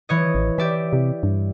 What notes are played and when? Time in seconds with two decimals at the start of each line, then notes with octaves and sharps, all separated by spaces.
0.09 E3 C#5 D#5
0.35 A1
0.58 E3 G4 D5 E5
0.93 C3
1.23 G2